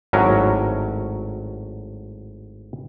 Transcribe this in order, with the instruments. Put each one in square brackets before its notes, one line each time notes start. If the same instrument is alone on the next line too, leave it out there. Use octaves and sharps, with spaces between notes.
[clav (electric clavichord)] G#1 A2 F#3 C#4 A#4 C#5